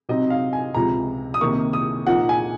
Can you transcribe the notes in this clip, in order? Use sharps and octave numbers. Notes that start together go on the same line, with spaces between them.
C3 F#3 C4 D#4 D#5
F5
G#5
C#2 C3 F3 A#5
D#6
C3 D#3 A#3 C#6
D#6
A#2 F3 A#3 D#4 F#5
G#5